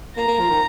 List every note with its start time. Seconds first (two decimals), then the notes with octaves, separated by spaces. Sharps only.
0.16 A#3 A#5
0.28 A#3
0.40 F3
0.50 D#3